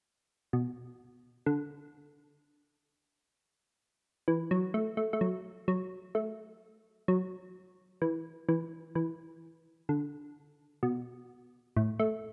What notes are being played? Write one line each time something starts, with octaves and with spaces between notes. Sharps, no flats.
B2
D3
E3
F#3
A3
A3
A3
F#3
F#3
A3
F#3
E3
E3
E3
D3
B2
A2
A3